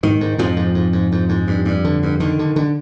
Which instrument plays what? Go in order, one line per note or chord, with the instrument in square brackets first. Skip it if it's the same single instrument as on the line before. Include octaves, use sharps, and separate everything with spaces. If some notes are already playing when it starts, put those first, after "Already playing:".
[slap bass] G#2 D#3
G#2
F2 G#2 F3
G#2
G#2
G#2
G#2
G#2
G2
G2
D3
G2
D3 D#3
D3
D3